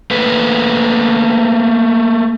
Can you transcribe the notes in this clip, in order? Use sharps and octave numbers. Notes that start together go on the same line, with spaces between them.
A3 A#3 B4